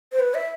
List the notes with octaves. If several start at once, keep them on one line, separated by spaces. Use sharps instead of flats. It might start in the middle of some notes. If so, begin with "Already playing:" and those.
C5
B4
E5